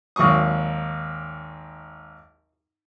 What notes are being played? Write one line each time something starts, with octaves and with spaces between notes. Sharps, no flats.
G#1 D#2 F#3 C#6 D#6